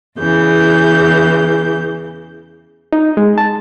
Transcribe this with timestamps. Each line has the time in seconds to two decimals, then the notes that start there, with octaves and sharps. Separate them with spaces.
0.17 E2 C#3 E3 G6
2.93 D#4
3.17 G#3
3.38 A5